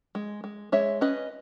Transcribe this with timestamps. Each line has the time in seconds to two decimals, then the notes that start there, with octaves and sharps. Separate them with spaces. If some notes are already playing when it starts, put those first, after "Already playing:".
0.15 G#3
0.44 G#3
0.72 G#3 C#5 E5
1.01 C#4 B4 D#5